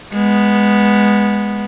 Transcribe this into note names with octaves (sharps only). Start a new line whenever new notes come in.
G#3 B3